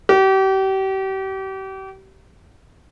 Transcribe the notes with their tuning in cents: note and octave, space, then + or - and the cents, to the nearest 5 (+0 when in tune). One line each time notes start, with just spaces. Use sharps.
G4 -35